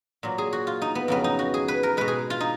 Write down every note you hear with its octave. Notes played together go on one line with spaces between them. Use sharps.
A#2 F#3
G#4
F#4
F4
D#4
B3
F2 C#3 F#3 B3
D#4
F#4
G#4
B4
A#4
B2 G#3 B4
G#4
F4
D#4